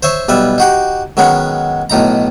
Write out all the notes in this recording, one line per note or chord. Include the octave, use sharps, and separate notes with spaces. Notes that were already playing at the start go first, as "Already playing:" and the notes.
C5 C#5 E5 C#6
B1 G3 B4 E5
D#4 F#4 G4
D#3 F#3 G#3 B3 C#4
B1 A2 D#4 A#5